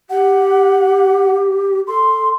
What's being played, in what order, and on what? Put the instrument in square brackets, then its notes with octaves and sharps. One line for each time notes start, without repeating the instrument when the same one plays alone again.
[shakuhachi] G4 [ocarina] F#5
[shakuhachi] A4 [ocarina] C6